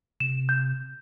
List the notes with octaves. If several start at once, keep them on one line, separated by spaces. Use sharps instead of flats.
C3 E7
G6